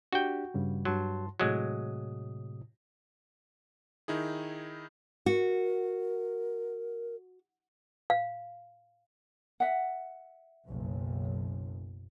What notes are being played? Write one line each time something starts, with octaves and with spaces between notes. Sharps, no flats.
D4 F#4 G4 G5
G2 C#3 G3
G2 F#3 A5 C6
A2 C3 F#3 G#3 D#6
D#3 D#4 E4 G#4
F#4 A#4
F5
E5 F#5
F#1 B1